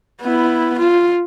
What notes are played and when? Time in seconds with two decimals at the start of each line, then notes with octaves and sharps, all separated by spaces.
0.22 B3 E4
0.78 F4